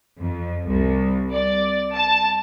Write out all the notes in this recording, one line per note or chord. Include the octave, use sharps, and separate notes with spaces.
F2
C2
D5
A5